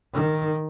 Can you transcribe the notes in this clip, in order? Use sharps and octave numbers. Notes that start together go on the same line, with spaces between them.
D#3